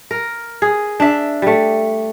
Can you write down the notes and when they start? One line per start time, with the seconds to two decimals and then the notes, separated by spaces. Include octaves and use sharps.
0.11 A#4
0.62 G#4
1.00 D4 E5
1.42 G3 A3